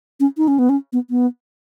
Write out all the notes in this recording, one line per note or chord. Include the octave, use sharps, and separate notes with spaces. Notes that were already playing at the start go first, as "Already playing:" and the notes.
C#4
D#4
C#4
B3
C#4
B3
B3